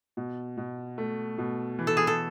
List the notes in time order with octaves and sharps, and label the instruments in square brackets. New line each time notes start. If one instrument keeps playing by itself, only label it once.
[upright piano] B2
B2
A3
B2
E3
[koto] A4
G#4
A4